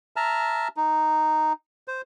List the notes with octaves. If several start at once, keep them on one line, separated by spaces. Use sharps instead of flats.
E5 A5 A#5 F6
D#4
C5